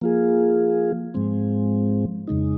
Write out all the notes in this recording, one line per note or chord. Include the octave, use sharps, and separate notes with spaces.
F3 A#3 F4 G#4
G#2 F3 G#3 C4
F2 C#3 G#3 D#4